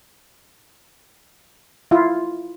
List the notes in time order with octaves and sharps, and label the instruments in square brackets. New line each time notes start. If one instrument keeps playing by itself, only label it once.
[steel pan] E4 F4